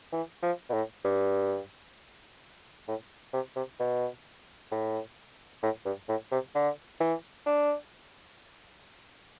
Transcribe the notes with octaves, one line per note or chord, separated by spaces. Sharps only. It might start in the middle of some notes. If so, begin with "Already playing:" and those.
E3
F3
B2
A2
G2
A2
C3
C3
B2
A2
A2
G2
A2
C3
D3
E3
D4